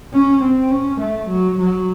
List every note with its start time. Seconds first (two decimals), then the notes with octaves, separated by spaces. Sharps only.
0.13 C#4
0.43 C4
0.71 C#4
1.01 A3
1.30 F#3
1.59 F#3